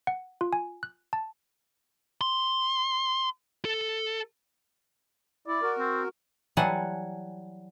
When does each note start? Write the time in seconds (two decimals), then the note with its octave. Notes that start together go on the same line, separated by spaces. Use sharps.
0.07 F#5
0.41 F4
0.53 G#5
0.83 F#6
1.13 A5
2.21 C6
3.65 A4
5.48 E4 D5
5.62 F#4 A#4
5.79 C4
6.57 E3 F#3 G3 F#5 G#5 A5